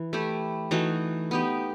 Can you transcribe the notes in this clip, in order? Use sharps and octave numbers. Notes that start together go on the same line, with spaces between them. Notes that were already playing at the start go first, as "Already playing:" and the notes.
Already playing: E3
A3 E4 G4
E3 A3 D#4 F#4
B3 D#4 G4